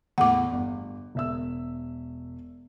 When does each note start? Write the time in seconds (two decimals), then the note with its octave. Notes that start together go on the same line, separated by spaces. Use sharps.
0.18 E2 A2 F#5 D6
0.53 G1
1.15 E1 E5 E6